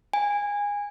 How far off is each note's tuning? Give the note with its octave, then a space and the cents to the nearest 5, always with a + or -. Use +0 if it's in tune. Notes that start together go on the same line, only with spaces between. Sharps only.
G#5 -20